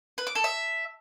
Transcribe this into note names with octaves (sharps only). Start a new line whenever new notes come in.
B4
D6
A4
E5